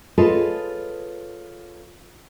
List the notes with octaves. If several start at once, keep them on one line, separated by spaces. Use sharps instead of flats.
F4 G#4 A4 B4 C#5 D#5